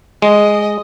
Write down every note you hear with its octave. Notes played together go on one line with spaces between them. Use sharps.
G#3 D#5